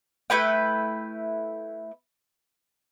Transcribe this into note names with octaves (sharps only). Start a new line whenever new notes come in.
A3 E4 B4 G5